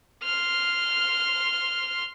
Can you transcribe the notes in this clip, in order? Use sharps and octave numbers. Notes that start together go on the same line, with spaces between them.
C6 F6